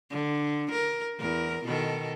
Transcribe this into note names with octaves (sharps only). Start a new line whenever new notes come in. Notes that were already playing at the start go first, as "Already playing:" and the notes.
D3
A#4
E2 A#4
B2 D#3 A4